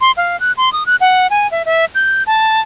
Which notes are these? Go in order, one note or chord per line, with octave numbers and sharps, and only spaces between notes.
C6
F5
F#6
C6
D#6
F#6
F#5
G#5
E5
E5
G6
A5